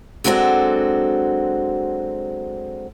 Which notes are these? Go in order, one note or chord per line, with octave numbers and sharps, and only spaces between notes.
F#3 G#3 C4 D4 F#4 A4